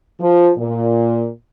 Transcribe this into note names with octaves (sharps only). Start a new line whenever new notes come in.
F3
A#2